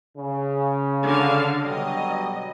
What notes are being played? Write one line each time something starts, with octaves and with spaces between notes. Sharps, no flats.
C#3
D3 F5
B2 F#3 G3 D#5